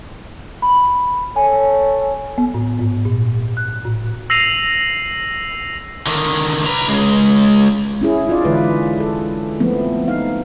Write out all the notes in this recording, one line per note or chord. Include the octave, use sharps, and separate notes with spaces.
B5
A4 C#5 G#5
B3
A2
G#2
A#2
F#6
A2
E6 A#6 C7 D#7 F7 F#7
D3 D#3
B4 A#5
C#2 G#3
C#4 E4 G#4
D#4 F4 D5
D3 E3 G#3 B4
A4
F3 A3 B3 C4
D#4 F5